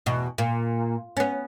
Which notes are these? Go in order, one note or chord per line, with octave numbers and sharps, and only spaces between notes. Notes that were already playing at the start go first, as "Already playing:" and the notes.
E2 B2
A#2
B3 C#4